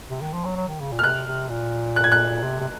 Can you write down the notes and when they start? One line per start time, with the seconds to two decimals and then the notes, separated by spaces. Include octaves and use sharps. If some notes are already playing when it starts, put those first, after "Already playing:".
0.10 C3
0.21 D#3
0.33 F3
0.44 F#3
0.56 F#3
0.68 D#3
0.80 C#3
0.92 A#2
0.99 F6
1.03 C3 F#6
1.26 C3
1.49 A#2
1.96 F#6
2.04 G#6
2.12 F#6
2.43 C3
2.60 C3